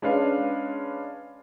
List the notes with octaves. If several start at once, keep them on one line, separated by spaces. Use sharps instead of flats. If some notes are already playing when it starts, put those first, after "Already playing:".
G#3 C#4 D4 B4 F5